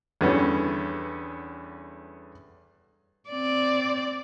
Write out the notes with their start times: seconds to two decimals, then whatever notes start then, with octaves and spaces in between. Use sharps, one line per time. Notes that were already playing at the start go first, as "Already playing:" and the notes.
0.21 E2 D3 G3 B3 C#4
3.30 C4 D5